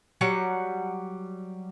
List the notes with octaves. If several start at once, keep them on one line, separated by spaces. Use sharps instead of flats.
F#3 G3 F#5